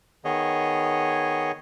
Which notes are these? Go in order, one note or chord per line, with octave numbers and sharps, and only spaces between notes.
D#3 B3 G#4 C#5 D#5